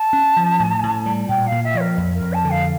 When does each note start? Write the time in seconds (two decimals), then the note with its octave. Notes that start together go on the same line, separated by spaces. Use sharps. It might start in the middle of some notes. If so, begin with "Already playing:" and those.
Already playing: A5
0.13 C#4
0.37 F3
0.60 A2
0.83 A2
1.06 G3
1.28 A#2 G5
1.46 F5
1.52 A#2
1.63 E5
1.74 F3 C#5
1.80 A#4
1.97 F2
2.15 A#4
2.21 F2
2.33 A5
2.44 D3
2.50 F5